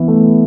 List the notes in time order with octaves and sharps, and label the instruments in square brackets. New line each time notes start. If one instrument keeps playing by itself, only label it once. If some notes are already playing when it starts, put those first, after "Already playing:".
Already playing: [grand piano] E3 E4 [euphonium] B3
[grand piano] A3